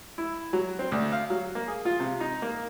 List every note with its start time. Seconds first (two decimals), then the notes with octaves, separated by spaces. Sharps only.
0.18 E4
0.53 F#3
0.79 C4
0.92 D2
1.12 F5
1.30 F#3
1.55 A#3
1.68 G#4
1.85 F4
2.00 C3
2.20 D#4
2.42 A#3